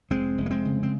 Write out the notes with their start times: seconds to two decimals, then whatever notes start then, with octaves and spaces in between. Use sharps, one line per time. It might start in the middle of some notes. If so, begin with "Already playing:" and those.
0.10 F1 G#3 C4
0.38 F1
0.46 A#3
0.51 G#3 C4
0.65 C#3
0.83 C4